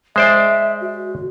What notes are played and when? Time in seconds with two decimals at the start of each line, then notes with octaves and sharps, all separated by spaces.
0.16 G#3 C5 D5 E5
0.81 F#4